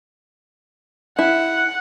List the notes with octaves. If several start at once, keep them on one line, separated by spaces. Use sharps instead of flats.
E4 F#5